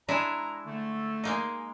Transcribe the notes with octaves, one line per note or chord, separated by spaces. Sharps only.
G#3 D4 E4 A#5
D3 A3
G#3 A#3 D#4